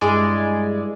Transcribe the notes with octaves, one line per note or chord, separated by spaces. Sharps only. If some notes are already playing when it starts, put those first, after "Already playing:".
G2 G#3 E4 D5 G#5